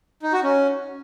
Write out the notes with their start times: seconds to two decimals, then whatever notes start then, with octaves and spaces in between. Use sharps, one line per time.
0.23 D#4
0.33 F#4
0.43 C#4